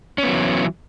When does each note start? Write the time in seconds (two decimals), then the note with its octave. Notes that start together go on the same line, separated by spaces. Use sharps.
0.18 C#4
0.23 B3
0.28 F#3
0.33 E3